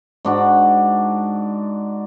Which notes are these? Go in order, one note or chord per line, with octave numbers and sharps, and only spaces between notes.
G#2 D4 F#4